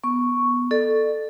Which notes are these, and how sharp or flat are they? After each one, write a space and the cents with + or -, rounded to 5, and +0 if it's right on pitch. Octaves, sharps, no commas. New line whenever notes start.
B3 -5 C#6 +0
A4 +0 D5 +35